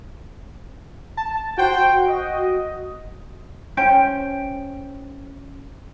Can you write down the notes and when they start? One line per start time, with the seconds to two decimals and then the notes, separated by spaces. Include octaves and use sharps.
1.17 A5
1.58 F#4 C5 G5
2.08 D#5
3.77 C#4 C5 G5 G#5